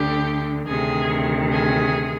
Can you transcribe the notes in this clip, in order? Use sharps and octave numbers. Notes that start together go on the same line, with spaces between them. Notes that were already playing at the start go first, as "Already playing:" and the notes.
Already playing: D2 D3 G4
D2 C3 D#3 G#4
G#4